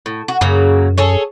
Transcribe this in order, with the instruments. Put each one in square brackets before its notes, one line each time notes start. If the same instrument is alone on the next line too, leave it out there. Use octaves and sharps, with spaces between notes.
[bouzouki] A2
F#4
[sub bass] F#2 [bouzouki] C#3 F#3 A#3
[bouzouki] G#4 A4 C#5